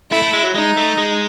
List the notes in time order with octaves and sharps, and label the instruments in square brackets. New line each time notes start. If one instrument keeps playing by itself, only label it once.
[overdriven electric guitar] A3 [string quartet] E4
[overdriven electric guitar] A3
G#3
F#3
[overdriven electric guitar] G#3 [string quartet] D#4
[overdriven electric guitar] A3
G#3